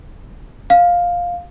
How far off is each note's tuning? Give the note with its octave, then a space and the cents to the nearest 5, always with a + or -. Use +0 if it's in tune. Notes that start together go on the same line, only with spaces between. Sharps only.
F5 +10